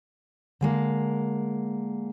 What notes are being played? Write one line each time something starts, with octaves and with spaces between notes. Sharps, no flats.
D3 G#3 A#3